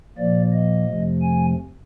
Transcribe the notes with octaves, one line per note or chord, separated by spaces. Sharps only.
A#2 F3 A#3 D5
D#5
F2 C3 F3 A3
G#5